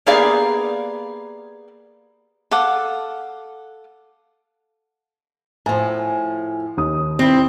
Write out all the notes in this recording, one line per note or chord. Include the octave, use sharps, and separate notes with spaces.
A#3 B3 G4 G#4 D5 F5
A4 F5 F#5 D6
A2 F3 G#5
D#2 D#6
G2 C4 E4